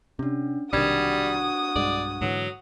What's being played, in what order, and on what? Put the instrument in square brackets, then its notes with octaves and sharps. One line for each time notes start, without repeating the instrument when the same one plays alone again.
[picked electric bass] C3 [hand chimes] C#4 D4
[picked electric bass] B1 C3 D#3 [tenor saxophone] G3 [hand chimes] D4 G#6 [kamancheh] F#4 D#6
[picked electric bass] B1 G2 G#3 [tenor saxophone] D5
[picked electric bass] G#2 D3 E3 [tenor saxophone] F#3